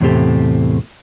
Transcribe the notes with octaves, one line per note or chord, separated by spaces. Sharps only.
E2 A2 C3 C4 G4 A4